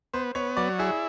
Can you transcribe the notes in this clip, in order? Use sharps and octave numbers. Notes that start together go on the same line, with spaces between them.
B3 C5
B3 C#5
F#3 D5
E4 G#4